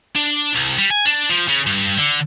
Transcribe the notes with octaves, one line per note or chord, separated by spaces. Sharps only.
D4
C2
G3
G#5
D4
F3
C#3
G2
D3